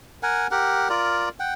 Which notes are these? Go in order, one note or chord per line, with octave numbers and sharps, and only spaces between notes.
A#4 F#5 G#5
G4 A#4 F#5
F4 A#4 D5
F#5 G5